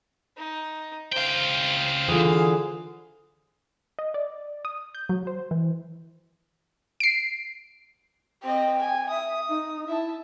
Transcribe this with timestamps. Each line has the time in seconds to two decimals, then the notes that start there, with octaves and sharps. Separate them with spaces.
0.37 D#4
1.12 C#2 C5 F5 G5
2.08 D3 E3 F4 G#4
3.99 D#5
4.14 D5
4.65 D#6
4.95 G6
5.09 F#3
5.27 C5
5.51 E3
7.00 C7 D7
8.43 C4 D#5 G5
8.79 G#5
9.09 E5 D#6
9.49 D#4
9.88 E4 E5 A5